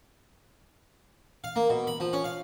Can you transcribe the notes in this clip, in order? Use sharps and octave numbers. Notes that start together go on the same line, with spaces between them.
F5
A#3
B2
B5
F3
C#4
F5